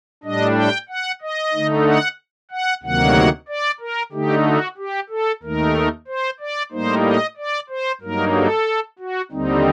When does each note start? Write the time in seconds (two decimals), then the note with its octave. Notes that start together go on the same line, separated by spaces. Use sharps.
0.23 A2 G3 D4 D#5
0.55 G5
0.89 F#5
1.21 D#5
1.53 D3 A3 D#4
1.85 F#5
2.51 F#5
2.83 D2 C3 D#3 F#3 A#3 F#5
3.48 D5
3.80 A#4
4.12 D3 A3 D#4 G4
4.45 F#4
4.77 G4
5.09 A4
5.43 D#2 D#3 A3 D#4 A#4
6.07 C5
6.40 D5
6.72 A2 G3 A#3 D#4 C5
7.04 D#5
7.37 D5
7.69 C5
8.01 G2 F#3 A#3 D#4 A#4
8.35 A4
8.99 F#4
9.31 D#2 D3 G3 C4 D#4